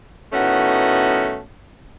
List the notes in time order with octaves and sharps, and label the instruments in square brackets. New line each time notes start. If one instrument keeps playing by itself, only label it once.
[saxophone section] A2 D#3 A3 B3 C#4 F#4